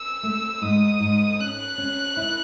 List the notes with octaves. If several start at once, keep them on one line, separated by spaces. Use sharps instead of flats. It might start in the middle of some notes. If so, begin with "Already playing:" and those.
Already playing: E6
A3
G#2 D#6
G#2
C#4 F#6
C#4
E4